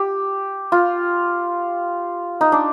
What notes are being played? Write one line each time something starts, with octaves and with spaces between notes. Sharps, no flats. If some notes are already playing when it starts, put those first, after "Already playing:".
Already playing: G4
F4
D#4
D4